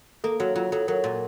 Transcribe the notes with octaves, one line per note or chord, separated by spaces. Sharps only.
A#3 A4
F#3 F#4
F#3 F4
F#3 A4
F#3 A#4
A#2